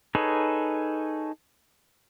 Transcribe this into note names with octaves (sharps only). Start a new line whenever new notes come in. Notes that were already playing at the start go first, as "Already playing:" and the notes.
D#4 G#4 A4 B4 C#5